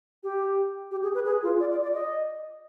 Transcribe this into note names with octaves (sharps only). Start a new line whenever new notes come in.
G4
G4
G#4
B4
G#4
F4
D5
D5
D5
D#5